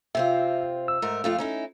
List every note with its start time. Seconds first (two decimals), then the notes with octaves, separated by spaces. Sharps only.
0.15 C3 C4 F4 E5
0.88 E6
1.02 G#2 A3 A#4
1.24 F2 A3 F4
1.38 C#4 D#4 E4